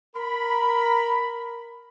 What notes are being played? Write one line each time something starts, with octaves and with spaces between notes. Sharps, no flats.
A#4 B5